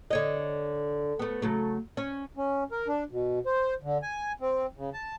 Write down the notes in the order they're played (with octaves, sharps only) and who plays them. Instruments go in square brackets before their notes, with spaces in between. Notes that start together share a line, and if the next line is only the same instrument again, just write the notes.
[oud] D3 C#5 D#5
A3 B3
C#3 F#3 A3
C#4
[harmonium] C#4
A#4
D4
B2
C5
D3
G#5
C4
C#3
A5